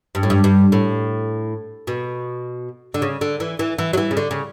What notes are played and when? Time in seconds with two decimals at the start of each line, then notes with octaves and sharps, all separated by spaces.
0.15 G2
0.23 A2
0.30 G2
0.44 G2
0.72 A2
1.87 B2
2.94 D3
3.02 C#3
3.21 D3
3.40 E3
3.59 E3
3.78 E3
3.93 F#3
3.97 E3
4.11 C#3
4.17 D3
4.31 C#3